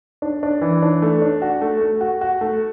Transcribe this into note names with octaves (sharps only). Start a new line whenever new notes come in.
D4
D4
E3
D4
A3
D4
F#4
A3
A3
F#4
F#4
A3